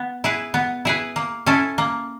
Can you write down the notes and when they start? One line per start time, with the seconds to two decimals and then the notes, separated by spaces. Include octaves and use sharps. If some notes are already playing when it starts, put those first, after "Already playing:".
Already playing: B3
0.24 E4 G#4 B4
0.54 B3
0.85 E4 G#4 B4
1.16 A#3
1.46 C#4 E4 A4
1.78 A#3